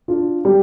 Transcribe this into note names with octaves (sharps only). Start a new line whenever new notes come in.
D4 F4
G3